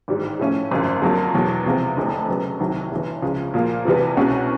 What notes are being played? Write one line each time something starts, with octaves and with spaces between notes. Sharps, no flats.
A1 G#2 D#3 G3
A2 F3 A3 C#4
G#1 F#2 D3 F3
F2 D3 F#3 A#3
E2 B2 F#3
E2 C3 F3 G#3 C4
F1 F2 D3
C#3 F#3 B3
C2 C3 D#3 F#3
G1 G2 E3
C#2 C#3 F3 G#3
A#2 F3 A#3
F2 C3 E3 G3 B3
C2 B2 G#3 C#4 F#4